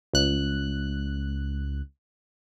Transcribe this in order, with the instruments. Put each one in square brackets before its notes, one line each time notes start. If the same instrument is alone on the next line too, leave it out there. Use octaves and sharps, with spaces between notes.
[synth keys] C#2 F#6